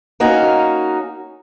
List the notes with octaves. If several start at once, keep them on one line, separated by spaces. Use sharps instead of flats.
A#3 C#4 D#4 F#4